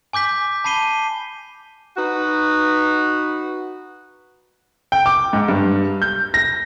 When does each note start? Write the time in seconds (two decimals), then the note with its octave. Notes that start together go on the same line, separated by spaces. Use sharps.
0.13 G#5 D6 G6 B6
0.64 A5 B5 C7 D#7 G7
1.97 D#4 F#4 B4
4.92 G5
5.06 D6
5.33 G#2
5.48 G2
6.02 G6
6.34 A#6